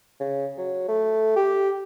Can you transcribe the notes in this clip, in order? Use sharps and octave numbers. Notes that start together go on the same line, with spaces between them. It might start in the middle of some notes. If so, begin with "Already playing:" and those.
C#3
F#3
A3
G4